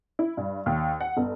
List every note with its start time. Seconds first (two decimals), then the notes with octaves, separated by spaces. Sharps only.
0.19 E4
0.37 G2
0.66 D#2
1.01 F#5
1.17 G1